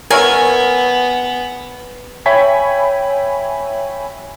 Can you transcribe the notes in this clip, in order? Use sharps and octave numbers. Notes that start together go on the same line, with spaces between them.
B3 A#4 C#5 E5 G#5
C#5 E5 G5 G#5 B5